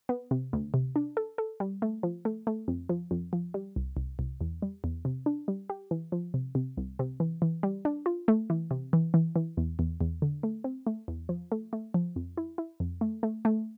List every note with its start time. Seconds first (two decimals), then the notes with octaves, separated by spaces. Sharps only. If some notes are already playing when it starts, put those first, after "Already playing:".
0.09 B3
0.31 C3
0.53 D2
0.74 C3
0.96 D4
1.17 A4
1.38 A4
1.60 G3
1.82 A3
2.03 F3
2.25 A3
2.47 A3
2.68 F2
2.89 F3
3.11 F2
3.33 F3
3.54 G3
3.76 C2
3.97 C2
4.19 C2
4.41 E2
4.62 G3
4.84 E2
5.05 C3
5.26 D4
5.48 G3
5.70 G4
5.91 E3
6.12 F3
6.34 C3
6.55 C3
6.77 C2
6.99 C3
7.20 E3
7.42 E3
7.63 G3
7.85 D4
8.06 F4
8.28 A3
8.50 E3
8.71 C3
8.93 E3
9.14 E3
9.36 E3
9.57 E2
9.79 E2
10.01 E2
10.22 D3
10.43 A3
10.64 C4
10.87 A3
11.08 E2
11.29 F3
11.52 A3
11.73 A3
11.94 F3
12.16 F2
12.37 E4
12.58 E4
12.80 F2
13.01 A3
13.23 A3
13.45 A3